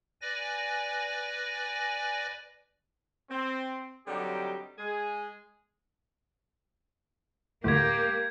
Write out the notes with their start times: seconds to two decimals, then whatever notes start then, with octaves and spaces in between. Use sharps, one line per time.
0.21 B4 D5 G#5 A#6
3.30 C4
4.07 D3 F#3 G3 C4 D#4 G4
4.78 G#3 G#4
7.64 D2 A2 A#3 G4 G6 G#6